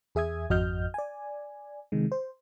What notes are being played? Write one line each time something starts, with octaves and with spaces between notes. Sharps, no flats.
E2 G#4 E5 D#6 G#6
G#1 F2 F#4 D#5 F6 G6
D5 G#5
C3 D#3 G#3
C5